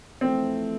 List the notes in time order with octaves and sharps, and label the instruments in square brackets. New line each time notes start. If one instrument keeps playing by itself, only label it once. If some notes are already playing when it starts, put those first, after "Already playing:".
[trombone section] F2 E3 A3 [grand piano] C4